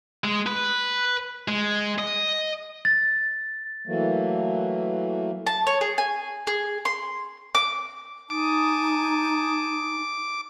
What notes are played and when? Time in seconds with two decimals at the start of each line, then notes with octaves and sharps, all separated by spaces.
0.24 G#3
0.47 B4
1.48 G#3
1.98 D#5
2.85 A6
3.87 E3 F#3 A3 A#3
5.46 A5
5.67 C#5
5.81 G#4
5.98 G#5
6.47 G#4
6.85 C6
7.55 D6
8.30 D#4 G#5 A5 D6 D#6